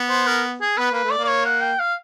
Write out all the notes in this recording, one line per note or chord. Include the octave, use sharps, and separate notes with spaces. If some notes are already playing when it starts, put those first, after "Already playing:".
Already playing: B3
C5
A#4
G#4
B3 B4
A#3 B4
A3
D5
A#3
D5
C#5
F#5
G5
F5